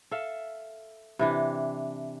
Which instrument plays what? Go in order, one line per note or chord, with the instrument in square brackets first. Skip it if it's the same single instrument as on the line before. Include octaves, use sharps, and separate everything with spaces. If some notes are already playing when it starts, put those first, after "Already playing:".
[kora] A4 E5 F5
C3 E3 D4